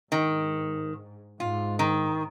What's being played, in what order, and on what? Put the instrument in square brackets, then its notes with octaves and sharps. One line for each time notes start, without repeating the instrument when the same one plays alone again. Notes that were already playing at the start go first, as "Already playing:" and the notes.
[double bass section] G#2 [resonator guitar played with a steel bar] D#3
[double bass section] G#2 [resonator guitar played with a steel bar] F4
[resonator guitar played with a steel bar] D#3